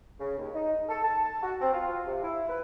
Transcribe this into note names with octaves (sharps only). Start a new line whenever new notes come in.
C#3
D#2
D#4
A4
A5
F#4
C4
F4
C3
E4
B4